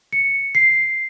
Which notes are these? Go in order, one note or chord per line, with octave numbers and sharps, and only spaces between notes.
C#7
C7